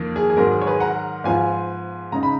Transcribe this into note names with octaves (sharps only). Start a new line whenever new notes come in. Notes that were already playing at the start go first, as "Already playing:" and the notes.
Already playing: F2 D#3 A#3
G#4
G#4
G#2 D#3 F#3 A#4
G#4
C#5
G#4 B4
F#5 A#5
G#2 F3 B3 F4 F5 G#5
C#3 G#3 D#4 A#5
B5